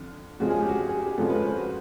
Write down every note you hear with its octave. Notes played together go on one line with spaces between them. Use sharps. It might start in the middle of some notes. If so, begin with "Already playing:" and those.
Already playing: F2 D3
F2 C#3 F3 G#3 F#4
G#4
G4
F#4
G#4
G4
G#4
F2 C#3 F3 G#3 A4
B4
C5
F#4